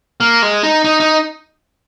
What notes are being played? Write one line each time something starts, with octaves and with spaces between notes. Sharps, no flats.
A#3
G#3
D#4
D#4
D#4